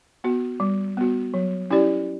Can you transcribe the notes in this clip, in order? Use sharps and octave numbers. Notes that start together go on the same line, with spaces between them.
B3 F#4
G3
B3 F#4
F#3
C#4 E4 G4 D5